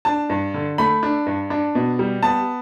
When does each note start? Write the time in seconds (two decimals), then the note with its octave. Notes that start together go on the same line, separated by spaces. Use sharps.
0.05 D4 A5
0.30 G2
0.54 D3
0.78 A3 B5
1.03 D4
1.26 G2
1.50 D4
1.75 B2
1.99 G3
2.23 B3 A5